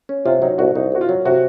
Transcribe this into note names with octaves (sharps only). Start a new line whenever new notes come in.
C#4
C3 F4
F#3 D#4
C2 F#4
C2 D#4
C3 F#4
F4
F#3
C3 F#4